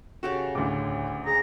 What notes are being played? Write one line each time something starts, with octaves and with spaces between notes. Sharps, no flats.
C#3 F#4 G4 A4
A1 D2 D6
G#4 A#5